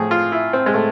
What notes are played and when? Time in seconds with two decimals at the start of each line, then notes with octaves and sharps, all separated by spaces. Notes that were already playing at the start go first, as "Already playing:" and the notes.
Already playing: A2 F3 G#4
0.11 F4
0.32 E4
0.53 C4
0.66 G#3
0.74 A2 A3